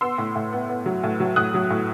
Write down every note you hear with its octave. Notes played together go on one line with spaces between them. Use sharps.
B3 C6 E6
A2
A2
B3
B3
F#3
A2
F#3
A2 D#6 F#6
F#3
A2